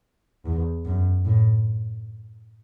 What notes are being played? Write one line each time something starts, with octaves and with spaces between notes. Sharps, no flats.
E2
F#2
A2